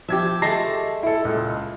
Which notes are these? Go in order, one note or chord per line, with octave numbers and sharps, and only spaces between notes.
F3 G4 E5 G#6
G#3 A3 A5 A#6 C7
E4 A4
C#2 A#2